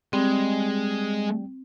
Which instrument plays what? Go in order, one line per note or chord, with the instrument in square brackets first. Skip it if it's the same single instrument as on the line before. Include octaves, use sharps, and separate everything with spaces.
[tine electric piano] G3 G5 [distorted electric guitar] G#3 [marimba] C4